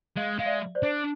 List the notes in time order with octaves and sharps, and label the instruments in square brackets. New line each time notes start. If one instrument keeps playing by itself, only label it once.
[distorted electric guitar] G#3 [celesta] D#5 F5
[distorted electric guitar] G#3 [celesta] F5
[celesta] D5 E5
C5 D5
[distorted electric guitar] D4